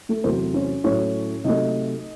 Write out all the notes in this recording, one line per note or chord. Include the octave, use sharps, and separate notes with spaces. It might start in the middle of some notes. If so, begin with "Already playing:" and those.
A3 A4
E2 C3 F#3 A3 C4 C5
C#4 C#5
A2 F#3 A3 C#4 C#5
C3 F#3 A3 D#4 D#5